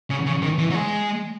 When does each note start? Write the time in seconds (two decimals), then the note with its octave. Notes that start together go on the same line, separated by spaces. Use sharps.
0.10 C#3
0.26 C#3
0.42 D#3
0.59 E3
0.71 F#3
0.74 G#3